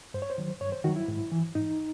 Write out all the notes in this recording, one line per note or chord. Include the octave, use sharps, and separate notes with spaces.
G2 C5
C#5
C5
D#3 F#3
G2 C#5
C5
D#3 F#3 F#4
E4
G#2
E3
G#2 D#4